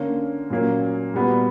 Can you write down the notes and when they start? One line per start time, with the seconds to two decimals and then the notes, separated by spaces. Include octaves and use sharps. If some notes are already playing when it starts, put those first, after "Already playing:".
Already playing: D3 A#3 C#4
0.50 A#2 F#3 A#3 C#4
1.14 A#2 G3 B3 F#4 B4